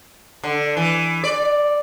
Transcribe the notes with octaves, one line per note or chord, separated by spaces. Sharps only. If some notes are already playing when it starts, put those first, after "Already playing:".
D3
E3
D5